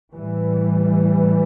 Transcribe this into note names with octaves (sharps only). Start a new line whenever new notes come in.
A2 E3 G3